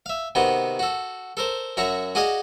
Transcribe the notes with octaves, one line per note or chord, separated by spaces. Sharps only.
E5 F5
C3 D#3 B3 F#4 C6
F#4 A4
A4 A#4 C5
F#2 F#4 E5 A#5 C#6
F#4 G#4 D5 D#5 F5 G#5